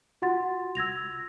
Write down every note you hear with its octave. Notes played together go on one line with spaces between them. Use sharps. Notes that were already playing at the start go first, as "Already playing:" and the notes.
F4 F#4 F#5 C6 A6
E6 G#6 A#6 F7